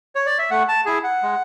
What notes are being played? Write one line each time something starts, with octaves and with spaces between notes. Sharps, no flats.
C#5
D5
E5
A3 F#5
A5
E4 G#4 G#5
F#5
G#3